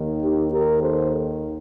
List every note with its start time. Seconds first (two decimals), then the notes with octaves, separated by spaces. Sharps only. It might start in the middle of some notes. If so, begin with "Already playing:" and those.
Already playing: D#2 D#3
0.22 D#4 G4
0.52 G4 A#4
0.81 A4 C5